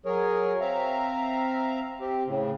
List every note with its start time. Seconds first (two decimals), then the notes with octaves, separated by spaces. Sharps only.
0.05 F#3 G#4 A#4 C#5
0.61 C4 E5 F5 A#5
2.00 C4 G4
2.27 A2 C#3